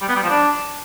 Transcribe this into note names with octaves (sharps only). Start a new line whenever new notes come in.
G3
B3
G3
F3
D4